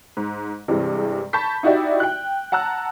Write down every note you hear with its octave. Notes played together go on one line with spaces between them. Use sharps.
G#2
G2 C3 E3 G#3
A5 B5 C#6 G6 B6
D#4 E4 F#4 G4 D5 E5
G5 F#6
F#5 A5 A#5 E6 F#6